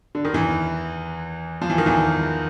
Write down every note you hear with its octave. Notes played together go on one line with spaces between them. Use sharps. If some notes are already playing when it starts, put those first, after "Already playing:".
D3
D#3
E2 E3
F3
E3
D#3
E2 E3